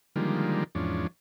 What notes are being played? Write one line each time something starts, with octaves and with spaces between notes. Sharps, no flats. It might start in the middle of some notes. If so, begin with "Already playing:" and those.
D3 D#3 F3 G3 G#3 A#3
E2 G#2 F3 C#4 D4